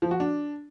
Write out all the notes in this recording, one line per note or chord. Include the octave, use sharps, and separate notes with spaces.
F3
F#4
D4